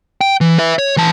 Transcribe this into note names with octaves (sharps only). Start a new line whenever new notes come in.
G5
E3
B4 E5
C#5
E3 A5